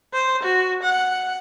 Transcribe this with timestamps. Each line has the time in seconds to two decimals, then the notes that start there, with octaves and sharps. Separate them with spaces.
0.14 C5
0.43 F#4
0.83 F#5